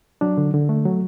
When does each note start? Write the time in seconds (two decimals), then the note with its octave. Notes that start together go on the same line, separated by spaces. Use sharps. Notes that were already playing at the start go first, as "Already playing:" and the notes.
0.21 F#3 D4
0.37 D3
0.54 D3
0.69 A3
0.85 F#3